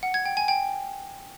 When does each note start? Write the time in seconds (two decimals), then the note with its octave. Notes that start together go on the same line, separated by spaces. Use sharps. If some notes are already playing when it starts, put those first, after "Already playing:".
0.03 F#5
0.14 G#6
0.26 G5
0.37 G#5
0.48 G5